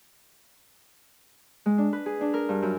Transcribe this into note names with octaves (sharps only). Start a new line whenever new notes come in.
G#3
D4
B4
G#4
D4
A#4
G2
F#2